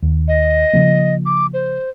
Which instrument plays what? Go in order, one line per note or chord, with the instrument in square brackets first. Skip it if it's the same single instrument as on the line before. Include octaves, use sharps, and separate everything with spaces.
[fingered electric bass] D#2
[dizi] D#5
[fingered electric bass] C#3 F3 A#3
[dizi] D6
C5